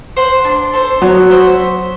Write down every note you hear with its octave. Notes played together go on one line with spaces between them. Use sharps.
C5 F#5
D4
A4 C5
F#3 B3
F#4 C5 E5